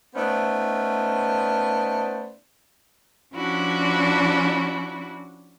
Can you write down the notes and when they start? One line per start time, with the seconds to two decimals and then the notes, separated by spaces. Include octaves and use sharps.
0.16 A3 B3 C#4 D#4 C5 D5
3.34 F3 C#4 D4 E4 F#4